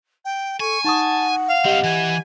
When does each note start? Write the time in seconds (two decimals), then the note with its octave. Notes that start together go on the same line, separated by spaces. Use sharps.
0.25 G5
0.60 A4 G#5 C#6
0.84 D#4 F#5 A5 C#6 D#6
1.48 F5
1.65 G3 C4 G4 D#5
1.84 E3 G#5